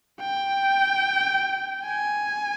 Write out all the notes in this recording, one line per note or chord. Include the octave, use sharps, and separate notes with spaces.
G5
G#5